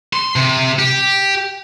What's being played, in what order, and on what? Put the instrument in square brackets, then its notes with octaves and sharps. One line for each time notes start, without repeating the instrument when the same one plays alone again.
[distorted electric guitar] C6
C3
G4